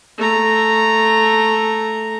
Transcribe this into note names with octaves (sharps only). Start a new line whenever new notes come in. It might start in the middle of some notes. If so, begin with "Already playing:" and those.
A3 A#5